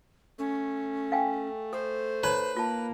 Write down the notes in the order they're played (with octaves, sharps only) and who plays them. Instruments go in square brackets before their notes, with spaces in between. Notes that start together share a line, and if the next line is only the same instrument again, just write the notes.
[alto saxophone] A3 [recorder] C#4
[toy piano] F5 G5 G#5
[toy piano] A4 [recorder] C5
[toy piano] D#4 C#5 A#5 [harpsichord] B4
[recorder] A#3 [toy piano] F4 A5